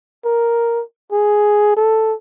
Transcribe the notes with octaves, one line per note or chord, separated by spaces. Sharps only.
A#4
G#4
A4